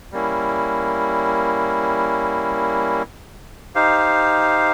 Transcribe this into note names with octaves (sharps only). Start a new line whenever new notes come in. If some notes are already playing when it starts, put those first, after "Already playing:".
G3 A#3 C#4 E4
D#4 G4 C5 F5